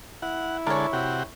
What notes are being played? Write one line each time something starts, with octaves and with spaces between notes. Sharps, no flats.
E4 F#5
D3 G#3 A4 A#4 C#5
C3 F#4 G4